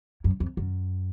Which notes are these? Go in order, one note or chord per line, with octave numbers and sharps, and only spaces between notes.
F#2
F2
F#2